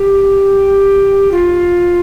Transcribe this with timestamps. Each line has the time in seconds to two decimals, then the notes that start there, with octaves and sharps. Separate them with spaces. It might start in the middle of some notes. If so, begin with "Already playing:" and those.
Already playing: G4
1.31 F4